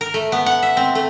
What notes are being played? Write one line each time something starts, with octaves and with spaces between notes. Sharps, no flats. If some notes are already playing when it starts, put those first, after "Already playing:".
A#4
A3
B3
F#5
E5
C4
A3